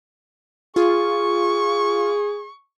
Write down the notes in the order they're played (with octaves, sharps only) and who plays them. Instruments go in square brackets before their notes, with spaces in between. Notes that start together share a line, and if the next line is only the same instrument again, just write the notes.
[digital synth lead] F4 [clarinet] G#4 [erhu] C#6